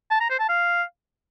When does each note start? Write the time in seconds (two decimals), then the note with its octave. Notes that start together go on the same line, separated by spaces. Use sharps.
0.11 A5
0.20 A#5
0.30 C5
0.40 A5
0.49 F5